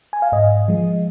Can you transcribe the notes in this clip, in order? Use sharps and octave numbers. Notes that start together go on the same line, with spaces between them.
G#5
F5
G#2 D#5
F3 G#3